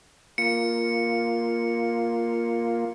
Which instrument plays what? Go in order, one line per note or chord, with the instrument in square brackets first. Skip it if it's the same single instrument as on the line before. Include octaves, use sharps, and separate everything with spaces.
[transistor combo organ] A#3 F4 [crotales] C#7